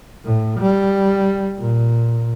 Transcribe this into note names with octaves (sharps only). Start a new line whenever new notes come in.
A2
G3
A#2